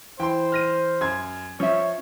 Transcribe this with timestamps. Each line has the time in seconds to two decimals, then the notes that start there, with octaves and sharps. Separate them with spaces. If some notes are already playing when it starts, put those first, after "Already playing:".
0.20 E3 C5 G5 C6
0.52 F6 A#6 D#7
1.01 F#2 C6 G#6
1.60 F3 C#4 C#5 E5